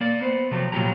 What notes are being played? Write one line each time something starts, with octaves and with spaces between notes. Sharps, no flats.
A#3 D5
B3 C5
C3 F3 F#3 A3
A#2 C#3 F#3 F4 G4 A#5